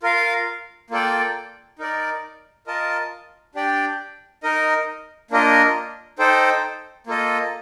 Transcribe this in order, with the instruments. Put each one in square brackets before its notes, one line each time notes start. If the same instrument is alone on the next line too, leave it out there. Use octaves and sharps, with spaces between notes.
[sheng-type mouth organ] F4 A#4 F5
A#3 F4 A4 D5 G5
D#4 A#4 D5
F4 A#4 D#5 A5
D4 G4 D5 G5
D#4 A#4 D#5
A#3 D4 F4 A#4 D#5
D#4 A4 C5 G5
A#3 F4 A4 D#5